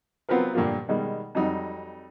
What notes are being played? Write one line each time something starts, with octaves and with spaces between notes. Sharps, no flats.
F#3 B3 C4 F4 A#4 B4
G2 A#2 D3 F3 A#3 F4
B2 D#3 G3 G#3
F2 F#3 G3 D#4